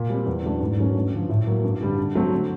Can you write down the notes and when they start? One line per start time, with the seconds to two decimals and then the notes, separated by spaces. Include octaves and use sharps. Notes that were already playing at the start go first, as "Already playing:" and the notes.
Already playing: A#2
0.10 G3 C4
0.26 E2
0.43 C#3 F#3 A3 D4
0.61 G#2
0.78 D#3 F#3 A3 C#4
0.95 G2
1.12 D3 F3
1.29 A2
1.47 F#3 A#3
1.64 G2
1.81 D3 G3
1.98 D3
2.15 F#3 A3 C4
2.32 D3